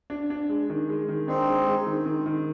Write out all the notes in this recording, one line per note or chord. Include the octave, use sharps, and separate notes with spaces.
D4
D4
G#3
D#3
G#3
D#3
C4 D4 D#4
G#3
G#3
D#3
D#3
D#3